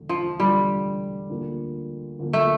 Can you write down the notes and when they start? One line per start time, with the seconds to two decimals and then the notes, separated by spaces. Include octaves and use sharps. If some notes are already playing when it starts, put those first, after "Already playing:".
Already playing: E1 D2 D3
0.09 F3
0.39 E1 D2 D3 G3
1.29 D2 D3 F3 A#3
2.19 D2 D3 F3 A#3
2.33 A3